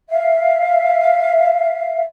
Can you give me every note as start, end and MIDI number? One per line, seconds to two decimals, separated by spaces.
0.09 2.03 76
0.09 2.03 77